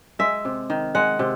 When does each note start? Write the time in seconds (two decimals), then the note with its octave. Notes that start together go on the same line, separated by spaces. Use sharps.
0.19 G#3 E5
0.45 C3
0.70 D#3
0.95 G#3 F#5
1.19 C3